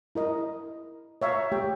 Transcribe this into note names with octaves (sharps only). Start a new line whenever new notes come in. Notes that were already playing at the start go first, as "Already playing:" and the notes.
E4 A#4 D#5
C#5 E5 F5 A#5
A3 G4 G5